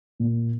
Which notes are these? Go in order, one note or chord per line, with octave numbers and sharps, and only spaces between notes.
A#2